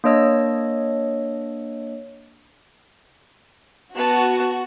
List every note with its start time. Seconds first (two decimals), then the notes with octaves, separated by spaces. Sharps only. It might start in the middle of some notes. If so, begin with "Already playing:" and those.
0.04 A#3 D4 C#5 D#5 E6
3.95 B3 F#4 A5